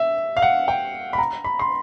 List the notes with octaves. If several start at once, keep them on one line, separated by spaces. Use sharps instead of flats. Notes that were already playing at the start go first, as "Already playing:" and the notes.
Already playing: E5
F5
F#5
G5
B5
A#5
B5
C6